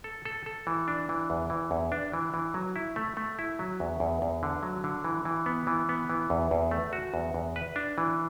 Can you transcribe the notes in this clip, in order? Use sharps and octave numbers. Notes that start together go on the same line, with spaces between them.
A4
A4
A4
E3
D4
E3
E2
E3
E2
D4
E3
E3
F#3
E4
A3
A3
E4
F#3
E2
E2
E2
D3
F#3
D3
E3
E3
B3
E3
B3
E3
E2
E2
A3
F#4
E2
E2
B4
D4
E3